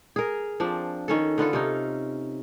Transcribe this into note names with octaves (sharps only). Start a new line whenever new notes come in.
G#4 A#4
F3 C4 D4
D#3 C#4 A4
D3 B3 F4 A4
C3 C#4 D#4